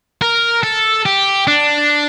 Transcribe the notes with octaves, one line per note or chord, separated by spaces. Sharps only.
A#4
A4
G4
D4